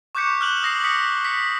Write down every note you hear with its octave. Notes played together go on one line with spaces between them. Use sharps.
C#6 D6 F#6 G6 B6 C#7
F6 F#6 F#7
D#6 A#6 C7 F#7
D#6 A#6 B6 C#7
B6 C#7